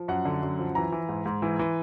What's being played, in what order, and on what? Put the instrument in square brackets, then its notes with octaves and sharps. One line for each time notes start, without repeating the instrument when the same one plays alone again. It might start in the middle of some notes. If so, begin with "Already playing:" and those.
Already playing: [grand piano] F3
F#2 F#5
D3
F#2
F3
E3 A#5
E3
G#2
G#2
E3
E3